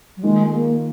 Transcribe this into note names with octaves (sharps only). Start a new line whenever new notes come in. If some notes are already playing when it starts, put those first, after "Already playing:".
F#3
D#3 G#3 A#3 F4 G#4
A#3